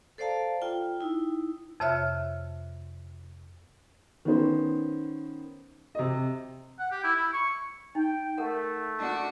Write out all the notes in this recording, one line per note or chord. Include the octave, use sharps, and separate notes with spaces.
A4 C5 D5 F5 A5 A#5
F4 G5
D#4 E4
F2 C3 C#5 E5 F6 F#6
D#3 B3 C#4 C5
C3 D#5
F#5
G4
E4
E4
C#6
D#4 G5
A3 A4 A#4 F#5
D4 F#4